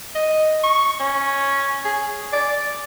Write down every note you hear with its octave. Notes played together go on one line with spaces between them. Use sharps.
D#5
C#6
C#4
G#4
D5